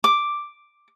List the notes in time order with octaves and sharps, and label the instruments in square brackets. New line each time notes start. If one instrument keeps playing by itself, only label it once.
[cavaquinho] D6